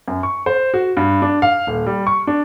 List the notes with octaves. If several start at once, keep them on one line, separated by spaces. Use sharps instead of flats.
F#2
C#6
C5
F#4
G2
D4
F5
D#1
G3
C#6
D4